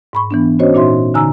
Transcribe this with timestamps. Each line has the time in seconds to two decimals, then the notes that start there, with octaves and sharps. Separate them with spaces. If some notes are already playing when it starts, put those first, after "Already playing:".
0.13 G#2 B5 C#6
0.31 E3 B3 D4
0.59 C#4 F#4 C5 C#5 D#5
0.74 A#2 D#4 F#4 E5 C6
1.14 D3 D#4 G#5 A#5 E6